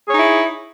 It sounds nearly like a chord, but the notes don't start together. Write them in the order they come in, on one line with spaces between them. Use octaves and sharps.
G#4 C#5 D#4 E4